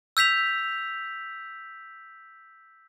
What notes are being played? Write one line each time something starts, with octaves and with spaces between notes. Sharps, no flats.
E6 G6 B6 F7